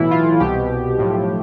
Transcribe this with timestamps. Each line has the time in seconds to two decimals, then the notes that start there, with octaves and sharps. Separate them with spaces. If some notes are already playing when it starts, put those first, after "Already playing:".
Already playing: B1 A2 E3 E4
0.11 F4
0.40 C2 B2 G4
0.98 B1 A2 F3